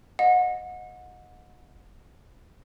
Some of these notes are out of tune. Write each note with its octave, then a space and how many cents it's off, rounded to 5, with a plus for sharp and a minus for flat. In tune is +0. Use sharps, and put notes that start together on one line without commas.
D#5 +0 F#5 -30